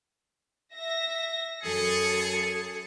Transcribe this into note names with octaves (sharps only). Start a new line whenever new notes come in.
E5 A#6
F#2 G#4 A4 C#7